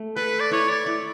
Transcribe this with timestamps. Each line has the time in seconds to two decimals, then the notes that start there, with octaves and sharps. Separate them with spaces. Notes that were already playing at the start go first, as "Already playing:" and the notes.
Already playing: A3
0.16 A4 B4
0.40 D5
0.51 E4 C#5
0.69 D5
0.86 E4